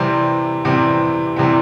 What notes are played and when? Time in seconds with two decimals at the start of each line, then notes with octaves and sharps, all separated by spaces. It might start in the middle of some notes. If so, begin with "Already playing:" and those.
Already playing: C3 E3 G3 C4
0.65 C3 E3 G3 C4
1.36 C3 E3 G3 C4